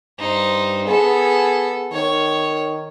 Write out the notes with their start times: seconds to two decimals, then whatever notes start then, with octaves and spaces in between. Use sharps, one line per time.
0.19 G2 D#4 C5
0.88 B3 G#4 A4
1.92 D#3 C#5